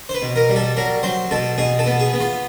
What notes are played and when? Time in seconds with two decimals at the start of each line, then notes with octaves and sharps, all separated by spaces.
0.09 C5
0.14 B4
0.22 B2
0.36 A#4
0.50 G3
0.56 A4
0.77 F#3 A#4
1.03 F#3 C5
1.31 B2 A4
1.58 B2 G#4
1.79 A4
1.86 B3
2.00 G#4
2.14 B3
2.20 F4